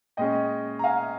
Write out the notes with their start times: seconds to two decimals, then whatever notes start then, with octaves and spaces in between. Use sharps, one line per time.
0.17 A#2 G#3 C#4 D#5 G5
0.79 A#5
0.84 F5 G#5